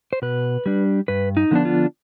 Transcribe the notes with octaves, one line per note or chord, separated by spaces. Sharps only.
C5
B2 B4
G3 D4
G2 B4
D#4
D3 F3 B3 D4
F4